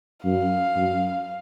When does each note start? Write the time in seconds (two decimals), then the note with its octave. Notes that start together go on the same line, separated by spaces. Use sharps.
0.24 F#2 F5
0.76 F#2